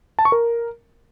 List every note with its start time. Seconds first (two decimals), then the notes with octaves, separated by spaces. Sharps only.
0.19 A5
0.25 C#6
0.32 A#4